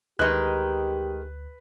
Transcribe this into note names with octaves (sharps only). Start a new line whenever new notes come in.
D2 D#3 G#3 D#4 G4 B4 F#6